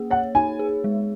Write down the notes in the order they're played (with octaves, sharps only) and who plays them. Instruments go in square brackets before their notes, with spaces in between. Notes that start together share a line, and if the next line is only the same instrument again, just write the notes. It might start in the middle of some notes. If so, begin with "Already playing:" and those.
Already playing: [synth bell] A#3 G#4
[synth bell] C#5 [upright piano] F#5
[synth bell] D#4 [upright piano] G#5
[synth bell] G#4
G#3